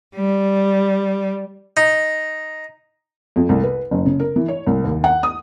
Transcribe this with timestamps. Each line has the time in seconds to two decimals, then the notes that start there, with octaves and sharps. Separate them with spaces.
0.15 G3
1.77 D#4
3.36 F2
3.49 C2
3.63 B4
3.91 F#1
4.06 C#3
4.20 A#4
4.36 E3
4.48 C#5
4.67 C2
4.84 D#2
5.04 F#5
5.23 D#6